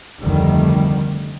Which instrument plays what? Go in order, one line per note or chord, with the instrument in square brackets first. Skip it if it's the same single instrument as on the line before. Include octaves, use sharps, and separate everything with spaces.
[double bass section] F1 D2 D#3 G3